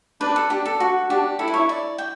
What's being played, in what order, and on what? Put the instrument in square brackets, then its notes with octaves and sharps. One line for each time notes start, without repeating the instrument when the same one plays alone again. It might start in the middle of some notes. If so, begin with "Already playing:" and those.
[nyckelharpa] D4 [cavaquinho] B4
[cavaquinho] A4
[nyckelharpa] D4 [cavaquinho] G4
[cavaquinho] A4
F#4
[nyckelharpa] D4 [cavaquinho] G4
[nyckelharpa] E4 [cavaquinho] A4
[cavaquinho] B4
C#5
D5
G5